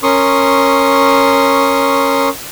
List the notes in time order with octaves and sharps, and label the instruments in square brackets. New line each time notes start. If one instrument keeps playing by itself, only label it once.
[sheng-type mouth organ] C#4 A#4 C6 C#6 D#6